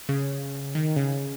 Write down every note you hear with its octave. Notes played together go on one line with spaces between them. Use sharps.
C#3
D#3
C#3